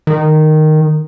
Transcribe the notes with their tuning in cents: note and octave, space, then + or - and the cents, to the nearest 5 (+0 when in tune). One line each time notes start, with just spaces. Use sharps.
D#3 -10